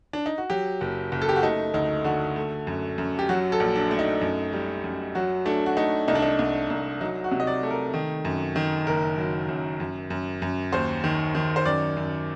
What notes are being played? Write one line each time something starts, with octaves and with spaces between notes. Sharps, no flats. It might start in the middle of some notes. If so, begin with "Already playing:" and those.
D4
D#4
F#4
F#3 G4
F#1
F#1
A4
G4
F#4
A3 D#4
D2 D#4
D3 F#4
A3
F#2
F#2
G4
F#3 F#4
A4
A#1
D4
A3
D#4
F#2
G3
F#2
F#3 F#4
A3 D4
F#4
A3 D#4
C2 D#4
D4
D#4
C2
C2
F#3 D#4
F#4
C3
D#5
D5
A3
A#4
D#3
F#2
D#3
F#1 A#4
F#3
F#2
F#2
F#2
F#2
D#2 C5
D#3
D#3
C5
F#2 D5
F#2